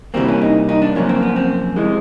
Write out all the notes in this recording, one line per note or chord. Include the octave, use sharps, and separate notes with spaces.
C3 E3 G3 A#3 C4
C#4
D#4
D#4
D4
F#2 C#3 F3 A#3 C#4
C4
B3
C4
C3 E3 G#3